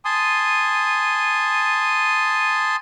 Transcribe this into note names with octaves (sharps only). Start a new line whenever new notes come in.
G#5 A5 C6 D#6